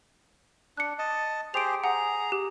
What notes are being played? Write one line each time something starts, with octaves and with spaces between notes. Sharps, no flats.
D4 F#6 C#7
D#5 A5
G4 G#4 C5 D7 F7
G#4 F#5 A#5
G4